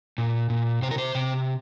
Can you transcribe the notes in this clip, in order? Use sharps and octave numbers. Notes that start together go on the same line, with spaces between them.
A#2
A#2
C3 C5
A#4
C5
C3